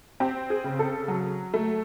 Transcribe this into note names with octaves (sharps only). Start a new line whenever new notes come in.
C4 G4
G#4
C#3
A4
F#3
A3